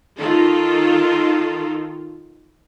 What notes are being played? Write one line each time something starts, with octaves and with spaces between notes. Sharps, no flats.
D#3 F4 A4